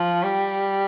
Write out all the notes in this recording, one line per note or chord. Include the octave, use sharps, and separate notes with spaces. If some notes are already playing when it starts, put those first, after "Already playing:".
Already playing: F3
G3